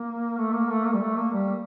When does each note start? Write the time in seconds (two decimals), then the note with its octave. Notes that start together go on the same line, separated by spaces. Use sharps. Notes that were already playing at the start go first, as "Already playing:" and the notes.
Already playing: A#3
0.37 A3
0.53 A#3
0.69 A3
0.85 A#3
0.94 G3
1.01 A3
1.17 A#3
1.33 G3